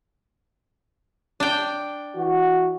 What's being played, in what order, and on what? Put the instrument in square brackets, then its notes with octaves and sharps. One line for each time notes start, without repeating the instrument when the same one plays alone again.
[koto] D4 G5
[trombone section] E3 F#4